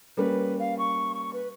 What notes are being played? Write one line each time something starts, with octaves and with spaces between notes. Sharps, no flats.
G3 A#3 C#4 B4
F5
C#6
C#6
B4